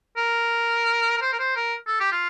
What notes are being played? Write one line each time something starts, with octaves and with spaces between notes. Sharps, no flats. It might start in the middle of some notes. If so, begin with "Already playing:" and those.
A#4
A#4
C5
A#4
C5
A#4
A4
G4
F4